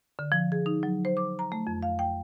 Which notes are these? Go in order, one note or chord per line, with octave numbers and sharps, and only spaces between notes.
D3
F3
G#4
D#4
F#3
C5
D6
A#5
A3
F2
F5
G5